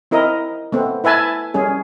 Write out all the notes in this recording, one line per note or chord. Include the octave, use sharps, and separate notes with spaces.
C4 E4 A#4 D#5
A3 B3 C4
E4 B4 E5 G#5 A5
G3 C#4 G#4